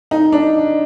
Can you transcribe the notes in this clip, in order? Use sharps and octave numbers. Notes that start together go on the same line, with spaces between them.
D#4
D4